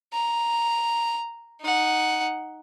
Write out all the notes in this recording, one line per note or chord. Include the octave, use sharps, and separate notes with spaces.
A#5
D#4 F#5